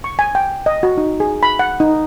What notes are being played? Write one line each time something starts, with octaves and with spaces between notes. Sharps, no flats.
C#6
G#5
G5
D#5
F#4
D#4
G#4
B5
F#5
D#4